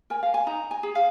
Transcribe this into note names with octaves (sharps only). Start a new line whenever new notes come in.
A#4 G#5
F5
G#5
D#4 A#5
G#5
G#4
F5